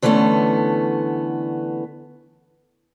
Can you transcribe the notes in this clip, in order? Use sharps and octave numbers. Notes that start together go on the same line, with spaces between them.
D3 E3 G3 A3 B3 C#4